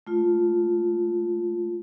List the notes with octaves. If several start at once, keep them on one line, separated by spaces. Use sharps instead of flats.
A3 F4